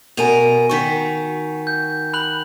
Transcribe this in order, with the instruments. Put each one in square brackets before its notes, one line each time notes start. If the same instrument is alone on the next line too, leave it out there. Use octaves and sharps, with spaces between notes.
[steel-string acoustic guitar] B2 A#4 [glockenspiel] G#5 D#7 F7
[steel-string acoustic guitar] D#3 F#4 [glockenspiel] C#6 B6
[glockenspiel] G6
B5 F#6 F#7